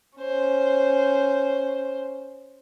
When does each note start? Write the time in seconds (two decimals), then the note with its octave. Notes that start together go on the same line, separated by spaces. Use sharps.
0.17 C#4 C5